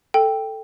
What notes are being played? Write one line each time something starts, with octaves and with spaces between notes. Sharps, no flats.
A4 G5